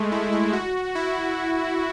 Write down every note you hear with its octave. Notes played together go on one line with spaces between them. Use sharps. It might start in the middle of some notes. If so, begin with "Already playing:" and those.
Already playing: G#3 A3
E4
E4
F#4
E4